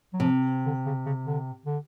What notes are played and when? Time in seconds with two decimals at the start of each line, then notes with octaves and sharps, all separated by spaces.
0.13 F#3
0.20 C3 F3
0.66 D3
0.86 C#3
1.06 C#3
1.26 D3
1.65 D3